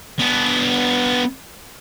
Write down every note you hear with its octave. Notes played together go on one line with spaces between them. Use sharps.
B3 D4